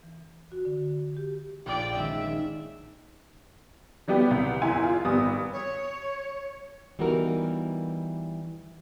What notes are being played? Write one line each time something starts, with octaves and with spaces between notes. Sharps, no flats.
E3
F#4
D3
G4
A#1 F4 D5 G5 G#6
D#3 G#3 C#4 E5
F#3 G3 B3 G4 B4
C2
F#1 E2 E4 G#5 C6
F4
G#1 G3 B3 D#6
C#5
E3 G3 B3 D#4 F#4 A#4